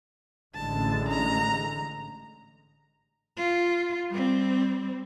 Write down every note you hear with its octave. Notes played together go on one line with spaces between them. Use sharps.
A1 D3 G#3 A5
A#5
F4
G3 C4